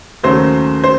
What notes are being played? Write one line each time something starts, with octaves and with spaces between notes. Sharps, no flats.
D#2 C#3 F#3 A3 C5
C5